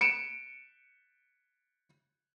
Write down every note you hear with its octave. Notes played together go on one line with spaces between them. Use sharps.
C#7 D7 E7